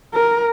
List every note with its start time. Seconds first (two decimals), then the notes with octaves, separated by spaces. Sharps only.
0.14 A#4